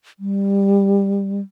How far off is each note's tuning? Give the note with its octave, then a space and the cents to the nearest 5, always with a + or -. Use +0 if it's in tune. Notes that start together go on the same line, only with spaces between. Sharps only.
G3 +15